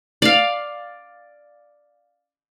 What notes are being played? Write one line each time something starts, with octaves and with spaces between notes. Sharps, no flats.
D5 F5